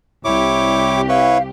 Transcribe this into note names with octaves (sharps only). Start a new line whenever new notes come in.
C2 E4 G4 C#5 D6
E4 B4 C#5 F5